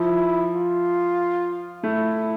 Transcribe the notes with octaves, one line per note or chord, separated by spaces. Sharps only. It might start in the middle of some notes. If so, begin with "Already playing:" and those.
Already playing: F3 E4
F4
A3 E4